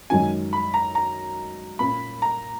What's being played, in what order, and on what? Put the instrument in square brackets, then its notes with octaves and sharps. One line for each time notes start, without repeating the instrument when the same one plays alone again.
[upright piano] F#2 D#3 G#3 D#4 [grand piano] G#5
[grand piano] B5
A#5
A#5
[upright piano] A#2 A#3 C#4 [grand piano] B5
[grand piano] A#5